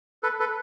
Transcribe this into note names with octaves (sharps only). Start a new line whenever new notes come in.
A4 B4
A4 B4